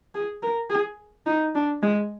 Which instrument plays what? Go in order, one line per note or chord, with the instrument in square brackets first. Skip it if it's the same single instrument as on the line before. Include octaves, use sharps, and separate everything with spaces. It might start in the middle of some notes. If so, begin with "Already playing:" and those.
[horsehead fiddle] G#4
A#4
G#4
D#4
D4
G#3